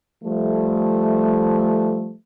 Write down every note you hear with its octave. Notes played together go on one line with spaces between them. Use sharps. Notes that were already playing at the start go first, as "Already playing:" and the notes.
F3 G3 A3